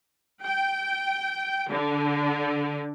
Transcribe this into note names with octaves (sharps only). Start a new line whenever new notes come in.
G5
D3